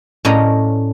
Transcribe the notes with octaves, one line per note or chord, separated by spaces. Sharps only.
A2 C#4 D5 D#5 A#5